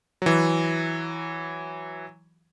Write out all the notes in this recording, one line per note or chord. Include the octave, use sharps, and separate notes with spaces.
E3 F#3